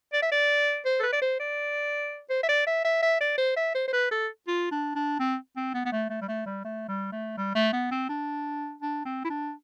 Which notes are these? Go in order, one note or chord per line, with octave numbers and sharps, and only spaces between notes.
D5
E5
D5
C5
A4
B4
D5
C5
D5
C5
E5
D5
E5
E5
E5
D5
C5
E5
C5
C5
B4
A4
F4
D4
D4
C4
C4
B3
B3
A3
A3
G3
A3
G3
A3
G3
A3
G3
A3
B3
C4
D4
D4
C4
E4
D4